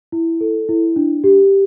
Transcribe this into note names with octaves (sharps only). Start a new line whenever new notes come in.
E4
A4
E4
D4
G4